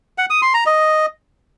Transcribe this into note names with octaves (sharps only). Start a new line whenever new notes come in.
F#5
D#6
C6
A#5
D#5